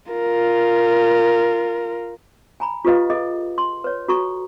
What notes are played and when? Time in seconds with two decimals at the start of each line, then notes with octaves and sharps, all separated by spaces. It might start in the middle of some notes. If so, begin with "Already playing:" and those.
0.12 F4 A#4
2.60 G#5 A#5 B5
2.85 F4 G4 A4 B4 D#5 F5
3.10 G#4 A4 D#5
3.58 C6
3.84 B4 C#5
4.08 F#4 A4 A#5 C#6